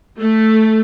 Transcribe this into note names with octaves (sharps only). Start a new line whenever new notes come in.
A3